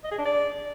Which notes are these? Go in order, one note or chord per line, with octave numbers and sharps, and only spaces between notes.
D#5
G#4
D4
D5